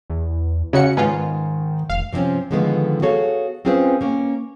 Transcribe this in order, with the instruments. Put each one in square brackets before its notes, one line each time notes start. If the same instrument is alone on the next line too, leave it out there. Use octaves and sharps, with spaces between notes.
[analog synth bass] E2
[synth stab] C#3 F#4 C#7 [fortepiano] C#4 C#5 F#5
[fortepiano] G#2 [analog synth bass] D#3 [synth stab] B3 C#4 F4
[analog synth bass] F1 [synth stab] F5
[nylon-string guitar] C3 F3 G3 C4 C#4
D3 D#3 F3 G#3 A3 B3
F#4 G#4 A4 C#5 F5
C4 C#4 F4 G#4 B4 C5
A#3 C#4